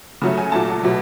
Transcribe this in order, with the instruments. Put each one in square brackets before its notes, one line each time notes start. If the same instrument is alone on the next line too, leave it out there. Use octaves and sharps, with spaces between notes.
[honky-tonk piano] C#3 F#3 A3
G#5
A#2 F#3 A3 A5
B2 F#3 A3